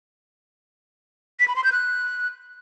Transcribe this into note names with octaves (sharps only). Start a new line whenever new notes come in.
B6
B5
C6
G6
F#6